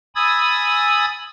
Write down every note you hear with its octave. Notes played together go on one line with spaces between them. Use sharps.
G#5 B5 D#6 E6 G#6 A6